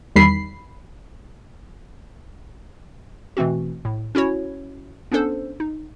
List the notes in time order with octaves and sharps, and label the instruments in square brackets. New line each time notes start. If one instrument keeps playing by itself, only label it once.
[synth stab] E2 D#3 G3 B5 C7
[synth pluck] B2 E3 A3 C4 F#4
A2
C#4 E4 F#4 C#5
B3 C#4 D4 A4 C5
D#4